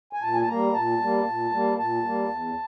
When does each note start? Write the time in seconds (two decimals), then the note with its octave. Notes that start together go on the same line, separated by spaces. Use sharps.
0.13 G#5
0.22 A#2 A5
0.33 G#5
0.41 A5
0.48 G3 A#3 A#5
0.74 A#2 A5
1.00 G3 A#3
1.26 A#2
1.52 G3 A#3
1.78 A#2 A5
2.04 G3 A#3
2.30 E2